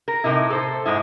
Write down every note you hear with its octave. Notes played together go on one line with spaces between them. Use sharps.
A#4
A2 C3 D#4 E4
A4 C5
G#2 C#3 G#3 E4